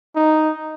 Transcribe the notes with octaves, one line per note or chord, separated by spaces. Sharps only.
D#4